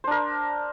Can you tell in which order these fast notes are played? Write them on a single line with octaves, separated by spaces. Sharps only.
C5 D4 A#4